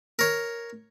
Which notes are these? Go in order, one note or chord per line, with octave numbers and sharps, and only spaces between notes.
A#4 C#5